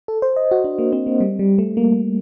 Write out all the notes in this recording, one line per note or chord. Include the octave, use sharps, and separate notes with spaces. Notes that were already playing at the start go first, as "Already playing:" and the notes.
A4
C5
D#5
F#4
D4
A#3
C4
A#3
G3
G3
A3
A#3